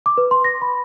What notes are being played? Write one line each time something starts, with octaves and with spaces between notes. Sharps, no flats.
D6
B4
C6
A#6
B5